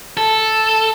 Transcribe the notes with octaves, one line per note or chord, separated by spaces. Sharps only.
A4